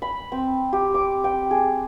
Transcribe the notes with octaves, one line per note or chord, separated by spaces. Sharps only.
B5
C4
G4
D6
G5
G#4